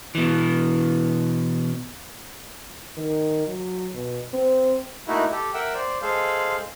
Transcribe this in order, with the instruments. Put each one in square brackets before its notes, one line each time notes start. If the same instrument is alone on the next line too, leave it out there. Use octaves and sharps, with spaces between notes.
[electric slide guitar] B2 E3
[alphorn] D#3
F#3
B2
C4
[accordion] A3 A#3 D#4 E4 F#4
G4 A4
A#4 E5 F#5 G5 E6
C5 D5
G#3 G#4 A4 C5 F5